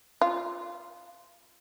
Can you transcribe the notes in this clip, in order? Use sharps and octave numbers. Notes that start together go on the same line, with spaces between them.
F4